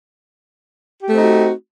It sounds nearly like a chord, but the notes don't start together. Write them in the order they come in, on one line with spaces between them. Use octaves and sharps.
G4 A3 C4 D#4 F#4